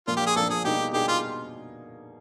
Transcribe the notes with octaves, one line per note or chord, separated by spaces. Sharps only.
A#2 F3 A#3 D4 F4
G4
G#4
A#2 F3 A#3 D4 A4
G#4
B2 G3 A#3 D#4 G4 G#4
B2 G3 A#3 D#4 G4 G#4
F4